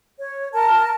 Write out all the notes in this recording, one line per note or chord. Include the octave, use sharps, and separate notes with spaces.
C#5
A#4 A5